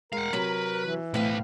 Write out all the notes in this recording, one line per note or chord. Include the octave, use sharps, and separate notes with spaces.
G#3 A#4 F5 F#5
C3 F#3 B4
E3
B1 A2 C4 B4 F5